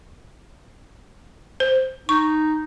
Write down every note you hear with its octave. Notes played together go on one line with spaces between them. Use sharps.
C5
D#4 C#6